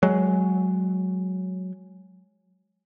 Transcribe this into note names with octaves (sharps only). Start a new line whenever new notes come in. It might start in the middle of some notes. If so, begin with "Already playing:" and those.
F#3 G#3